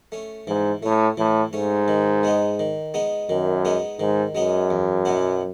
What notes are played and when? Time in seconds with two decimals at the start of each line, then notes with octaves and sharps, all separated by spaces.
0.12 A3 C#4
0.47 G#2 E3
0.83 A2 A3 C#4
1.17 A2 E3
1.53 G#2 A3 C#4
1.88 D#3
2.23 G#3 B3 D#4
2.59 D#3
2.94 G#3 B3 D#4
3.29 F#2 D#3
3.65 G#3 B3 D#4
4.00 G#2 D#3
4.35 F#2 G#3 B3 D#4
4.70 E2
5.05 B2 F#3 B3 E4